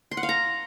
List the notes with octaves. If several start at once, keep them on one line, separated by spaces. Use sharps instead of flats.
C6
F#5
F5
A#5